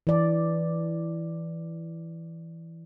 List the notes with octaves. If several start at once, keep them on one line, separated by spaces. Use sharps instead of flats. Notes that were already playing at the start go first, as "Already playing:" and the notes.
E3 D5